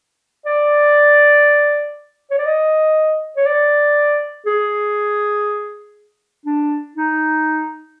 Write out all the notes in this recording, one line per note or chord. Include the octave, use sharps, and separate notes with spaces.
D5
C#5
D5
D#5
C#5
D5
G#4
D4
D#4